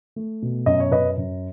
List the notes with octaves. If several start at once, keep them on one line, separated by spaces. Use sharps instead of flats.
A3
B2
F#2 D#5
C#5
F#2 B4 D#5
F#2